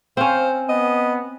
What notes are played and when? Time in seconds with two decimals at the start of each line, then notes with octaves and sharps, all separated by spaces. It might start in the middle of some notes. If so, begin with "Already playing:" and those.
0.17 C4 C#4 C5 F5
0.69 B3 D#5